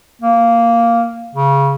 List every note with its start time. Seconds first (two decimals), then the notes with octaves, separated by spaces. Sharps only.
0.21 A#3
1.35 C#3